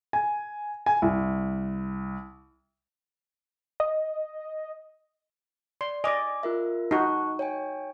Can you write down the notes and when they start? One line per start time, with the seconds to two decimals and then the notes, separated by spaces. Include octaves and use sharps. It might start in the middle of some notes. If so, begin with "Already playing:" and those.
0.13 G#5
0.86 G#5
1.02 C2
3.80 D#5
5.81 D5 C6
6.04 D5 D#5 G#5 D6
6.43 F4 A#4 E5
6.91 D#4 F#4 A5 C#6 F#6
7.39 C#5 G5 G#5